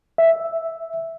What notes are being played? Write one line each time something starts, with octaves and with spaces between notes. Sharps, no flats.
E5